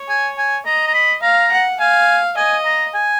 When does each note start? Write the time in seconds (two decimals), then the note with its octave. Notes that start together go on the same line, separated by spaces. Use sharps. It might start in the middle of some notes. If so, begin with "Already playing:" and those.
Already playing: C#5
0.09 G#5
0.38 G#5
0.66 D#5 A#5
0.87 A#5
0.94 B5
1.22 F5 A#5
1.52 F#5
1.79 F5 G#5
2.36 D#5 G#5
2.65 A#5
2.94 G#5